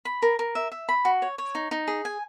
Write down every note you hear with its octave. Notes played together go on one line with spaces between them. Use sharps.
B5
A#4
A#4
E5
E5
B5
F#4
C#5
C#5
D#4
D#4
G#4
G#5